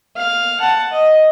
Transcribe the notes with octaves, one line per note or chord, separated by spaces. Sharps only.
F5
F#5 A5
D#5